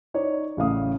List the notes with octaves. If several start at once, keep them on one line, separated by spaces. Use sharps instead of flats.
D#4 C#5 D5
A1 C#3 A3 F5 D#6